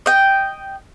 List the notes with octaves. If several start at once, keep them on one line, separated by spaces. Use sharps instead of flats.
D#5 G5